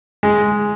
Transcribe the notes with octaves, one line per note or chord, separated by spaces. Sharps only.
G#3